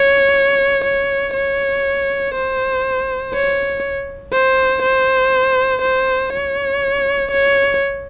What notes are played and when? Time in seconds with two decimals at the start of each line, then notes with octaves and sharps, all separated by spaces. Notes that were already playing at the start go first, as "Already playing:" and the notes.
Already playing: C#5
0.85 C#5
1.34 C#5
2.34 C5
3.34 C#5
4.32 C5
4.82 C5
5.82 C5
6.33 C#5
7.31 C#5